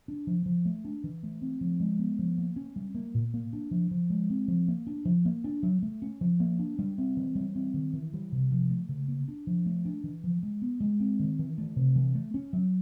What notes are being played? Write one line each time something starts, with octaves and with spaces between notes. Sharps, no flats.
D4
F3
F3
A3
D4
E3
A3
C4
F3
G#3
B3
F3
A#3
C#4
G3
A#3
A#2
A#3
D4
F3
F3
G#3
C4
F3
A#3
D4
F3
A#3
D4
F#3
A3
C#4
F3
A#3
D4
G3
C4
E3
G3
C4
D#3
E3
G3
C3
F3
A3
C#3
A#3
D4
F3
A3
D4
E3
F3
G#3
B3
G#3
C4
D#3
E3
A3
C3
E3
A3
C#4
F#3